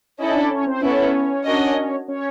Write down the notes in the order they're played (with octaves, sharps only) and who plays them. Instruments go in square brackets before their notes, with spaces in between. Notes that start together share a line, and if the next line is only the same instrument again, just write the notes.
[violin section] C#4 E4 A4 [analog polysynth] D#4 D#5
[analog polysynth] D4 D5
C#4 C#5
C4 C5
[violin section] B3 E4 A4 [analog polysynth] C#4 C#5
[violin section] D4 F#4 A#4 D#5
[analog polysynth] C#4 C#5